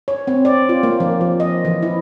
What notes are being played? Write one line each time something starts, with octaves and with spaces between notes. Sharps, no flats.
C#5
C4
D5
F4
A#3
F3
F3
D#5
E3
E4